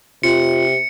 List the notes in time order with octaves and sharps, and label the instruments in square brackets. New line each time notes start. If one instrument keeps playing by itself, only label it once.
[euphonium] C3 [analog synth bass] F4 [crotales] C#7